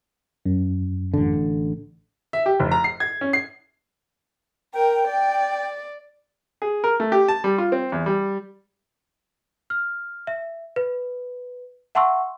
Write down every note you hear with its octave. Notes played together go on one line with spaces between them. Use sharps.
F#2
A1 D3
E5
G4
F1
A#5
C7
G#6
C#4
C7
A#4 G5
D5
G#4
A#4
A3
G4
A5
G3
F4
C4
E2
G3
F6
E5
B4
E5 F#5 A5 C6 C#6 E6